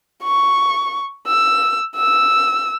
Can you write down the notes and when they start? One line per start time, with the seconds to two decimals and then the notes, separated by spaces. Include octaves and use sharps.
0.24 C#6
1.27 E6
1.96 E6